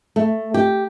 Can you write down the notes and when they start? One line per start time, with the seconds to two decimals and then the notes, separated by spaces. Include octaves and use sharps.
0.16 A3
0.54 G4